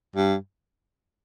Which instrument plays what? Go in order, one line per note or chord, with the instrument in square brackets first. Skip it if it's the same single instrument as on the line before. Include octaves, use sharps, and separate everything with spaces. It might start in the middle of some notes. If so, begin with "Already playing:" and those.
[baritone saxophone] G2